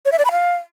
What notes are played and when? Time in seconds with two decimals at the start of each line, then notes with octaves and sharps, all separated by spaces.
0.05 C#5
0.12 E5
0.18 D5
0.25 B5
0.31 F5